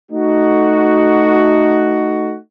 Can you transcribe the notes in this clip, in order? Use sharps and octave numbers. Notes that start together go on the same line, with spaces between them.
A3 D#4 F#4